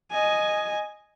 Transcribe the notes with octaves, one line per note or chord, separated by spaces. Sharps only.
D#5 G#5